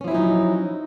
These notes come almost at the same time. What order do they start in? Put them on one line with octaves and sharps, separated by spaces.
C#4 F3 E4 F#3 D#4